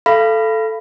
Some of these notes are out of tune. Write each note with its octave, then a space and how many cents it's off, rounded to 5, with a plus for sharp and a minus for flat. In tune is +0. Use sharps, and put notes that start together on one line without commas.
A4 +0 F5 -30 B5 +5